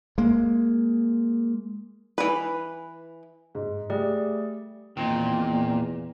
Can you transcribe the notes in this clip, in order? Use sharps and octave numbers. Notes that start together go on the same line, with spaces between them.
G#3 A#3
E3 B4
G#2
G3 A3 G#4 D5
E2 A#2 D#3 C4 D#4 G5